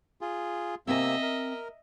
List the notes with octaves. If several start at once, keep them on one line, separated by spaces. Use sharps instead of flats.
F4 G#4
C3 A#3 C4 D#5 E5 G#5 E6
A#4